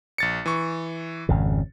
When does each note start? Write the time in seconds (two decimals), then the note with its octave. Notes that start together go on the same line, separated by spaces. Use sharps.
0.18 A#1 A6 C#7
0.46 E3 C#6
1.29 G#1 F2 C#3